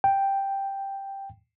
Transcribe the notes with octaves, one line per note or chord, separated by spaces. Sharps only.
G5